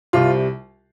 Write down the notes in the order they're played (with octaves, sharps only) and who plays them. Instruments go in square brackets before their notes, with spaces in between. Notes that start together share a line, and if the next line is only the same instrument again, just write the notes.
[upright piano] C2 C3 G3 F4